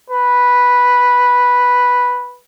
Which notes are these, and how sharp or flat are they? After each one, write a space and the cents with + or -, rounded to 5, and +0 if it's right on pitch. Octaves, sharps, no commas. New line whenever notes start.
B4 -5